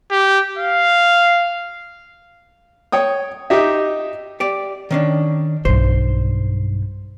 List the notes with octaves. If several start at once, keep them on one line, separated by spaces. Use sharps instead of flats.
G4
F5
C#5 G5 D#6
D#4 G4 D#5 E5
G4 D5
D#3 C#4 D4
B1 G2 C5